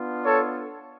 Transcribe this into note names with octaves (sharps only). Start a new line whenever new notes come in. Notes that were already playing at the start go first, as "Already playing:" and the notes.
Already playing: B3 D4 F4
A4 C#5